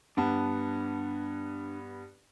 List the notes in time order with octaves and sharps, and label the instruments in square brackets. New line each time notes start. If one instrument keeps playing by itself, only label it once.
[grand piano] G2 B3 [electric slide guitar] D4 A5